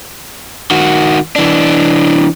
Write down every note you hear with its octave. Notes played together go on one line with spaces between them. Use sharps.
D#3 F#4
E3 D4